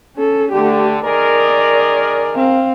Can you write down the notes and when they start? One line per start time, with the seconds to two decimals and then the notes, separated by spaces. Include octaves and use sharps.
0.16 C#4 A4
0.52 D3 A3 G4
1.02 D#3 G#4 A#4 D5
2.35 C4 F5